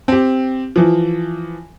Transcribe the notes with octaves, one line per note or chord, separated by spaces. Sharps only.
C4 G4
E3 F3